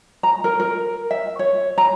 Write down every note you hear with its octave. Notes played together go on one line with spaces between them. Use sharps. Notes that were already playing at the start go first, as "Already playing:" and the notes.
A#5
A#4
A#4
E5
C#5
A#5